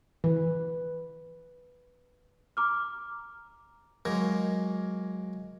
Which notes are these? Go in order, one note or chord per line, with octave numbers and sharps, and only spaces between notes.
E3 B4
A#5 D6 F6
F#3 G#3 A#3